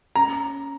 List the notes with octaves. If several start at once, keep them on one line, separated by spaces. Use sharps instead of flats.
C#4 A#5